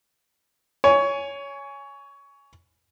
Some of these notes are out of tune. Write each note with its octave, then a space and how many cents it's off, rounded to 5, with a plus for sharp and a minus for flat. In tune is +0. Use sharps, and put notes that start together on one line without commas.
C#5 +15 G#5 +0